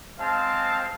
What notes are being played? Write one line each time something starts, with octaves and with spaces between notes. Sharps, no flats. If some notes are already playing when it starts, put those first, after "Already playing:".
G#3 C4 F5 A5